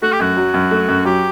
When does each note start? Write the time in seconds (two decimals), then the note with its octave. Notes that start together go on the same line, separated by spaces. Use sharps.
0.02 A3 F#4
0.12 G4
0.20 F#2 F#4
0.37 F#3
0.54 F#2
0.71 A3
0.88 F#2
1.05 F#3 G4